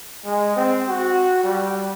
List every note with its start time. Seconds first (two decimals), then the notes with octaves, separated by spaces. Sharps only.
0.25 G#3
0.56 C4
0.88 F#4
1.44 G3